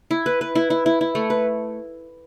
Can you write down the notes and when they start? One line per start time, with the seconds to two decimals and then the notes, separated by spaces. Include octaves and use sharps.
0.11 E4
0.26 B4
0.41 B4
0.55 E4
0.70 E4
0.86 E4
1.01 E4
1.15 A3
1.30 B4